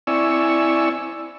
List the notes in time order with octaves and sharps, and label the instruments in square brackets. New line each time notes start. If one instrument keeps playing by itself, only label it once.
[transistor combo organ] C4 E4 D5 G#5 C#6 E6